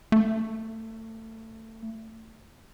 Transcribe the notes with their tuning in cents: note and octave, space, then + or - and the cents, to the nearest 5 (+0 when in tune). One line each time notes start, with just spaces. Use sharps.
A3 +25